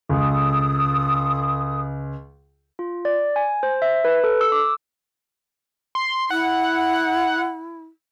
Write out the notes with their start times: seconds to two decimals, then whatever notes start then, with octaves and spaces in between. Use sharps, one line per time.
0.09 C#2 A4 D#6
2.79 F4
3.05 D5
3.36 G#5
3.63 C5
3.82 E5
4.05 B4
4.24 A4
4.41 E6
4.52 D6
5.95 C6
6.31 E4 F#5